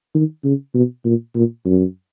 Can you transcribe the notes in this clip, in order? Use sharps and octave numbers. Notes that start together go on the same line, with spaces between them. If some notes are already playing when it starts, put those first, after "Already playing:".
D#3
C#3
B2
A#2
A#2
F#2